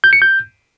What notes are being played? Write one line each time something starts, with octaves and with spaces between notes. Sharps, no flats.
G6
C#7
G6